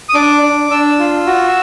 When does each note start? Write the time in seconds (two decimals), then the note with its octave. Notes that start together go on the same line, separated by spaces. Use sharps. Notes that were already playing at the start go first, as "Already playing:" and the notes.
0.09 D#6
0.14 D4 D6
0.43 D4
0.70 D4 E6
0.99 F4
1.27 F#4